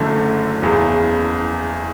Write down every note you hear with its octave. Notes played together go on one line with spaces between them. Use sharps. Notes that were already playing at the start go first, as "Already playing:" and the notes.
Already playing: F#1 F#2 D3 A3
F#1 E2 C#3